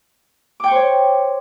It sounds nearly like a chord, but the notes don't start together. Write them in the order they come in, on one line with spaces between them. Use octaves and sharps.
D6 G5 C#6 C5 C#5